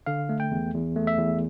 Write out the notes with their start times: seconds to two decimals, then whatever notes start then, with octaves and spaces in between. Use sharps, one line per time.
0.06 D3 F5
0.29 A3
0.40 G5
0.51 E2
0.74 E2
0.96 A3
1.07 E5
1.18 E2